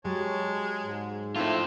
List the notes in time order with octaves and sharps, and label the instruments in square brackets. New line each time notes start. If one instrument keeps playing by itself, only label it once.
[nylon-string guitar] F#3 G4 [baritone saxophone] G#3 [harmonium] C#5 A5
[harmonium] G#2
[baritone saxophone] A2 [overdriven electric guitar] C4 F4 [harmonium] E5 A5